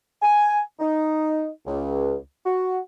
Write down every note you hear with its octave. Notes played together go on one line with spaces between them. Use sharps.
G#5
D#4
C#2
F#4